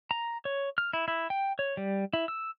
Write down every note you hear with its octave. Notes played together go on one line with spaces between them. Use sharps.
A#5
C#5
F6
E4
E4
G5
C#5
G3
E4
E6